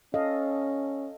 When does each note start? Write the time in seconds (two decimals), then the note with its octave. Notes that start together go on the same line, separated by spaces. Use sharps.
0.14 C#4 A4 D#5 F5